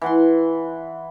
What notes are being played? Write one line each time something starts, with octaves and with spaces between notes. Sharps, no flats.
E3 F#5 C6